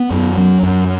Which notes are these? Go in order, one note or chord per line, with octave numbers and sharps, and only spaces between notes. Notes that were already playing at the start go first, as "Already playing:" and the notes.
Already playing: B3
F#2
F#3
F#2